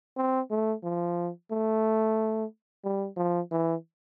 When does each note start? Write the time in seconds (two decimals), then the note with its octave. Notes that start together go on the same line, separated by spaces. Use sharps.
0.17 C4
0.50 A3
0.83 F3
1.51 A3
2.84 G3
3.17 F3
3.52 E3